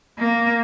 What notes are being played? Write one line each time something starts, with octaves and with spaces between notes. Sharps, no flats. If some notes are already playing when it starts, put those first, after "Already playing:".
A#3